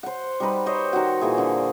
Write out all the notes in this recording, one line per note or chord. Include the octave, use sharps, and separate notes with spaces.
C5 F#5
G3 D#4 B4
G4 C5 C#5 D#5
D#3 F#4
A#2 E3 G#4
D3